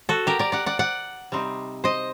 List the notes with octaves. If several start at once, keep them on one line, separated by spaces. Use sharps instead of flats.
F#4 A4
G4 A#4
A#4 D5
D5 F#5
D5 F#5
D5 F#5
C3 G3 C4 D#4
C5 D#5